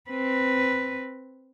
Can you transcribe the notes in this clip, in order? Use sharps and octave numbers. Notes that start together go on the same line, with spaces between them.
C4 B4